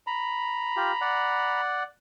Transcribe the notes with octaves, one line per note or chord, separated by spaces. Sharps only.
A#5 B5
F4 G4
D5 F#5